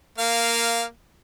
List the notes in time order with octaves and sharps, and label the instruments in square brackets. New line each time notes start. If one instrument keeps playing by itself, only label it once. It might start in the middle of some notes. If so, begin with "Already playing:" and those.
[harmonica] A#3 F5